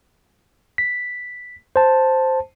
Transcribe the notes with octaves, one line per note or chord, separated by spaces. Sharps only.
B6
C5 A5